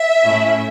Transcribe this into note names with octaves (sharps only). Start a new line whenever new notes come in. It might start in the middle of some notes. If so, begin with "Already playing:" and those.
Already playing: E5
A2 A3 C#4 E4